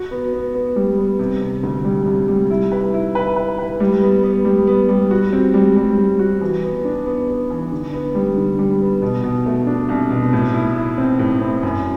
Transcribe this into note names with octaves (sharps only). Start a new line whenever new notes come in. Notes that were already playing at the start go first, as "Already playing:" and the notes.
Already playing: F#4
B3
B3
B3
G3
B3
C3
C3
D2
G3
C3
G3
E4
B4
E4
B4
B4
B4
G3
B3
B3
G3
B3
G3
F#4
C4
G3
G3
G3
F#4
E3
B3
D4
B3
B3
E3
D3
B3
G3
D3
G3
B3
B2
B2
A3
D4
C2
B2
A2
E4
E4
C4
A2
C4
F#2